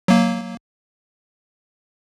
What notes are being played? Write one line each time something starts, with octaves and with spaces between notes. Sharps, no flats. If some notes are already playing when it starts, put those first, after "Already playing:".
F#3 A#3